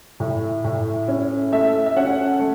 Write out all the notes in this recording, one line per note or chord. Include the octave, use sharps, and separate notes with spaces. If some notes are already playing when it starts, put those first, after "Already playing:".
A2
A2
C#4
A3 E5
E5
C#4 F#5
A3